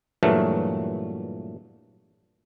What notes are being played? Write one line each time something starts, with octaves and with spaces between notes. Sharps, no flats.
G2 A#2 E3 F#3 A3